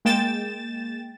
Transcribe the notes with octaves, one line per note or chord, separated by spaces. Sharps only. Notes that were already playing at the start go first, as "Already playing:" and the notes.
G#3 A#3 G5 A6 E7